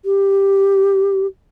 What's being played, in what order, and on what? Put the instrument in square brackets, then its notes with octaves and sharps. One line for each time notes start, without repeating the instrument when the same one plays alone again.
[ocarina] G4